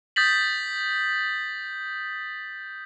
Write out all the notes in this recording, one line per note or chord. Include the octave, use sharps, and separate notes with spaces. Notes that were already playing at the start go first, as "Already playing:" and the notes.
D#6 G6 A6 B6 F#7